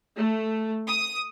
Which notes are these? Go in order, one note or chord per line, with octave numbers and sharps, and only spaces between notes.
A3
D#6